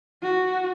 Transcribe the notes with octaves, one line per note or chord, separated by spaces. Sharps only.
F#4